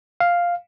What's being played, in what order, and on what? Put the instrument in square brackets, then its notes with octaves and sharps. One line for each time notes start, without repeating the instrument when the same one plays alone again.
[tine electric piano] F5